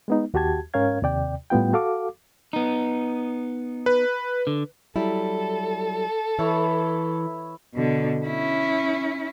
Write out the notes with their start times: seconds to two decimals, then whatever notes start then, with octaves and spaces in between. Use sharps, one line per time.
0.08 G#3 B3 D#4
0.34 D#2 F#4 G4 A5 G#6
0.74 G#2 C#4 A#4 C#5 F5 G#6
1.02 D#2 C3 D5 G5
1.50 A2 G3 B3 F4 G5
1.73 F#4 A4 F5 D6
2.53 B3 D#4
3.86 B4
4.47 D3
4.96 F#3 G3 E4 A4
6.39 E3 E4 C#5 E5
7.75 B2 D3
8.26 C#4 E4